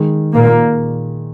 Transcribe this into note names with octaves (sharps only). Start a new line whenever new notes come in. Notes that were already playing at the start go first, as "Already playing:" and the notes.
Already playing: D#3 G#3
A#2 A#3